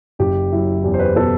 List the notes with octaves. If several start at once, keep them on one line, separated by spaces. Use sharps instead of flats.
F#1 G4
F#3 E4
E2 G4
C5
B4
B2 A4